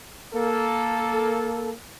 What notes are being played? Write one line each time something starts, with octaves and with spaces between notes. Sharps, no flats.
A#3 A4